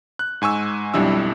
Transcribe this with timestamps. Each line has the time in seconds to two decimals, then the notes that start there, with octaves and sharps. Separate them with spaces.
0.19 F#6
0.42 G#2 G#5 C#6 E6
0.94 B1 F2 G3 D4 E4 E6